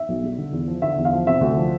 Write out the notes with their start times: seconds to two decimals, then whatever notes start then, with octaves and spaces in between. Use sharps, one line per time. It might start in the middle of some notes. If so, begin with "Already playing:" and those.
Already playing: E5
0.09 B1
0.24 G3
0.38 D3
0.52 E2
0.68 F3
0.82 D3 E5
0.98 E2
1.05 F5
1.13 F3
1.27 C3 E5
1.41 D2
1.57 F3